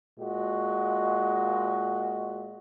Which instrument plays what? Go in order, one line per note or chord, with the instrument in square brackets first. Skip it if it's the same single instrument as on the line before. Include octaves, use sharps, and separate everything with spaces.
[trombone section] A#2 G#3 F#4